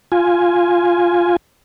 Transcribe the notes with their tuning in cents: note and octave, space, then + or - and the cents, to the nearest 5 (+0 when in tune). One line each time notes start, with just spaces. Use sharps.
F4 +0 G#5 +0